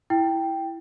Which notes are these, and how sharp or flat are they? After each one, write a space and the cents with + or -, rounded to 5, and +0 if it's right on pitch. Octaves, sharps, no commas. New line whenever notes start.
E4 +0 G5 +0